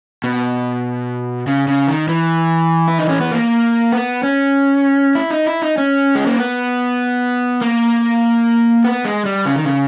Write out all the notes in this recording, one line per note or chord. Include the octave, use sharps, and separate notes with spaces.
B2
C#3
C#3
D#3
E3
E4
D#4
C#4
B3
A#3
B3
C#4
E4
D#4
E4
D#4
C#4
G#3
A#3
B3
A#3
B3
G#3
G3
C#3
D#3
C#3